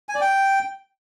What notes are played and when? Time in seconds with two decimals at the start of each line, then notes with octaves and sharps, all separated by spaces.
0.09 G#5
0.15 D5
0.21 G5